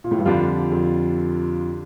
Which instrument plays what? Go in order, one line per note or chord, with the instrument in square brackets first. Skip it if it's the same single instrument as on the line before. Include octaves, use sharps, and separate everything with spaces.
[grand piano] A#2
A2
G2
[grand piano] F2 [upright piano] D3 G3 D4 F4
[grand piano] F2